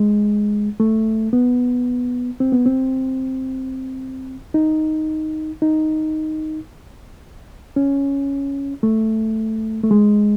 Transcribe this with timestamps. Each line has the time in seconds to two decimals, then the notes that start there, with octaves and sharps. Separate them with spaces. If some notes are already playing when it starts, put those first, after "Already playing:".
Already playing: G#3
0.80 A3
1.33 B3
2.40 C4
2.53 B3
2.66 C4
4.54 D#4
5.62 D#4
7.76 C#4
8.83 A3
9.83 A3
9.91 G#3